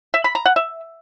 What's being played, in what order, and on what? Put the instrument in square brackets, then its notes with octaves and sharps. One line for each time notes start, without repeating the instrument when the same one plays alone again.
[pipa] E5
B5
A#5
F#5
E5